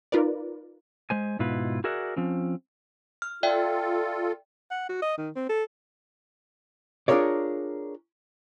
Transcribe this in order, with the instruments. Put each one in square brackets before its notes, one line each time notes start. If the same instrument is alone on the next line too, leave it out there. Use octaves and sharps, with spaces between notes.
[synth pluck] D#4 F4 A#4 B4 D5
[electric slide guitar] G#3 C5 G#5
G#2 B2 E4 F4 B4
F#4 G#4 A#4 D5 E5 F#5
F3 C4 C#4
[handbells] F6
[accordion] F4 A4 [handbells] D5 E5 G5
[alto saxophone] F#5
F#4
D#5
D#3
C4
A4
[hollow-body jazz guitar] D4 F4 G#4 A#4 C#5 D5